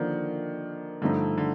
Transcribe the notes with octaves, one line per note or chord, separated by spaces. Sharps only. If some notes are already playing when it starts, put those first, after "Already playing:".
Already playing: D3 D#3 F3 A#3 D4
G2 D3 F3 A3 D#4
D3